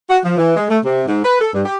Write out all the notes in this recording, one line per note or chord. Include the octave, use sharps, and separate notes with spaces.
F#4
F3
E3
G#3
A3
C3
G#2
B4
A4
G2
G4